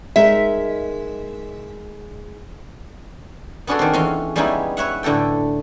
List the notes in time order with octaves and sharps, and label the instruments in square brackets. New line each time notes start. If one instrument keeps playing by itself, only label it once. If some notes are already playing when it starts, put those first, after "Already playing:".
[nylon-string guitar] G#3 D#4 A#4 [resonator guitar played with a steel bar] E5
[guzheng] B3 C#4 D4 F#4 G#4 A4
D#3 C4
E2 C#4 C6
G3 G#3 B3 C#4 D#4 E4
B4 C#5 E5 F#5
A2 D3 A3 A4 G5